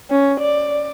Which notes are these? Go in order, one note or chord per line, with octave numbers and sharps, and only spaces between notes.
C#4
D5